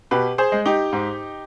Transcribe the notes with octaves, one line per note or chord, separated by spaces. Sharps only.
B2 G4 B4
G#4 C5
G#3
D#4 G4
G#2